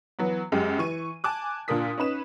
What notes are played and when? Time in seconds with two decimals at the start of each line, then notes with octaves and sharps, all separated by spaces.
0.19 E3 F#3 B3
0.52 F#2 G#3 G4
0.78 E3 C#6 D#7
1.24 G#5 A5 D6 F#6
1.68 A#2 D4 A#4 D#6 B6
1.98 C#4 D#4 B4 E7